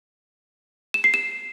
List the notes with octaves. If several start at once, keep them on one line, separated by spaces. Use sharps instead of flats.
E7
C7
E7